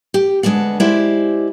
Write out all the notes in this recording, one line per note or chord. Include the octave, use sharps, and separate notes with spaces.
G4
D2 G#3 B3 D4 F#5
G#3 E4 G4 C5 D5